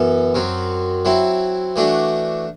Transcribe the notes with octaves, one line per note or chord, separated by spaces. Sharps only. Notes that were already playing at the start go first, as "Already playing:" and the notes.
Already playing: F#2 E3 B3 A4
F#2 F#3 C4
F#3 C4 E4
E3 A3 D4 F#4